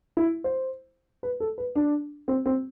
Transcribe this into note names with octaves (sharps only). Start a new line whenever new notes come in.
E4
C5
B4
A4
B4
D4
C4
C4